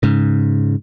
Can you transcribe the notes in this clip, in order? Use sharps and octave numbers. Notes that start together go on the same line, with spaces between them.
G#2 C#3